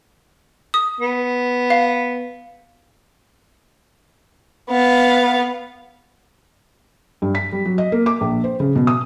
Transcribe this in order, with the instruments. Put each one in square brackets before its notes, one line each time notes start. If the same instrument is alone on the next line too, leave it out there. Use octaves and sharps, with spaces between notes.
[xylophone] D#6
[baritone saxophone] B3
[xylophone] F5
[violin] B3 F5
[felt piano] G2
B6
G3
F#3
D#5
A#3
D6
A#1
C5
C#3
B2
D#6